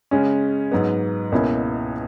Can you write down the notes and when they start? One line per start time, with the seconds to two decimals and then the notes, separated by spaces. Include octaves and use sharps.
0.11 C#3 G#3 C#4
0.72 G#2 F#3 B3
1.32 C#2 B2 A#3 C#4 E4